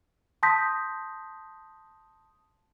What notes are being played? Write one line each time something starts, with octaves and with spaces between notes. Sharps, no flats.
A5 C6 D#6 G6 A#6 B6